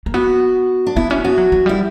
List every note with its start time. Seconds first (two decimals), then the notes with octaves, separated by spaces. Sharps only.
0.06 A#3
0.14 B3 F#4
0.87 D4
0.96 B3 E4
1.10 C#4 F#4
1.24 B3 F#4
1.38 F#3
1.52 F#3
1.66 G3 E4